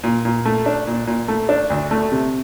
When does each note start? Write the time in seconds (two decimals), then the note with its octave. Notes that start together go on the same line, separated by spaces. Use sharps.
0.03 A#2
0.25 A#2
0.45 A3
0.66 D4
0.87 A#2
1.07 A#2
1.28 A3
1.49 D4
1.70 D2
1.91 A3
2.12 C3